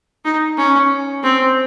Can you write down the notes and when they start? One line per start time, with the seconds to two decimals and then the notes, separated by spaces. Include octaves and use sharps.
0.25 D#4
0.58 C#4
1.23 C4